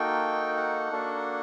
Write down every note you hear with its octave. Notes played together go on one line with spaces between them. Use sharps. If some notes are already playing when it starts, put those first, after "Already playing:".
Already playing: A#3 D#4 F#4 A4 G5
F#5
A#3 D4 F#4 A4